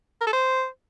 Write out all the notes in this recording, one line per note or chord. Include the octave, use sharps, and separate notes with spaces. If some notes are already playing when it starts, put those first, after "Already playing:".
A#4
A4
C5